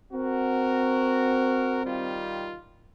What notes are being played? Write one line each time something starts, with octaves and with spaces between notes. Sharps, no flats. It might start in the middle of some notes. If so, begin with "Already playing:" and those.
C4 F#4 A#4
D#3 G3 F4